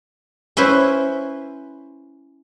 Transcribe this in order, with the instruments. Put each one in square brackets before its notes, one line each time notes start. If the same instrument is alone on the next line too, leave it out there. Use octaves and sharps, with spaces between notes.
[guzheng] C#4 E4 B4 C5